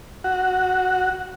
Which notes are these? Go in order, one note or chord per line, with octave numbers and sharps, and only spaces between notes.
F#4